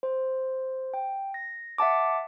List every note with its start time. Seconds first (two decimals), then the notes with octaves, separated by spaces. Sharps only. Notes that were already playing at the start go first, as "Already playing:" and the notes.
0.03 C5
0.94 G5
1.34 A#6
1.78 E5 F#5 A5 D6